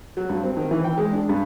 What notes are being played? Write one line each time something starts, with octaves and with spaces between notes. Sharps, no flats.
F#3
G2
C4
D#3
E3
G5
G#3
D4
G2